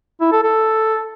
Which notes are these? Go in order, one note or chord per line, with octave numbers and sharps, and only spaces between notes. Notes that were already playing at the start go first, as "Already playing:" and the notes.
E4
A4
A4